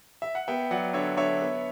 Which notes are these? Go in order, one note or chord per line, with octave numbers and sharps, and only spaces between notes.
E5
F#5
B3 E5 G5
F#3 D5 F#5
D3 C#5 E5
D3 C#5 E5
B3